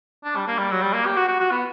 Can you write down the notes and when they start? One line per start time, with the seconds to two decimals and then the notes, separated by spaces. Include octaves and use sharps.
0.24 D4
0.36 G3
0.47 A#3
0.59 G3
0.71 F#3
0.82 G3
0.93 A#3
1.06 G4
1.17 F#4
1.28 F#4
1.40 F#4
1.51 B3